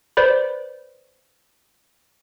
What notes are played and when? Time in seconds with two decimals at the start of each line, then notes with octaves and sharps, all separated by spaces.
0.17 B4 C5 D5 B5